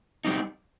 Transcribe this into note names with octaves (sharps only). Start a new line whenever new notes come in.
G3 C4 D#4